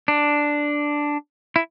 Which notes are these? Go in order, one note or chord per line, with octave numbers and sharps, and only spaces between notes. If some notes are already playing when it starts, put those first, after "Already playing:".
D4
E4